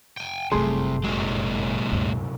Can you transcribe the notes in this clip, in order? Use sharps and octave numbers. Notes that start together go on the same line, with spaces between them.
G5 G#5
G1 C2 F#2 C3 A3 G#4 C6
C2 A#2 F#3 G#3
D2 G2